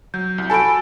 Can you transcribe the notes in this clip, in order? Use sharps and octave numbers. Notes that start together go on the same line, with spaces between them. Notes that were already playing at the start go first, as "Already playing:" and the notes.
F#3 G6
C2
F#4 A4 G#5 A5 B5 D7